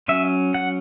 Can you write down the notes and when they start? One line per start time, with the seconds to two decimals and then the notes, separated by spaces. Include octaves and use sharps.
0.08 F#3 C#4 E5
0.54 F#5